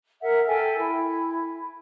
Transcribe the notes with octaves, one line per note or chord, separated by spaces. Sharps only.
A#4 E5 F#5
A4 E5 G5 G#5
E4